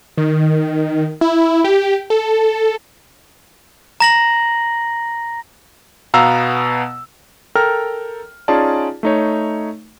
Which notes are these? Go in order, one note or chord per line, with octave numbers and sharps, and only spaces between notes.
D#3
E4
G4
A4
A#5 A#6 F#7
B2 B3 F5 A#5 E6
A4 A#4 G5 A#5 F6
C#4 D#4 F4 G#4 D5 A5
A3 D#4 C#5